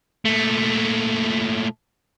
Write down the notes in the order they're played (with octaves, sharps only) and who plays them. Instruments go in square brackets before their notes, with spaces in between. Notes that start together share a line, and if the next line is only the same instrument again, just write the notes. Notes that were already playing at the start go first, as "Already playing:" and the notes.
[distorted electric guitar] A#2 A3